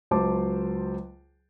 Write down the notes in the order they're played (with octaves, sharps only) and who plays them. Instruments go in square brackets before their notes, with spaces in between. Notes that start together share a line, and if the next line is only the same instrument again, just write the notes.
[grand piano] C#2 F#3 C5 A5 D6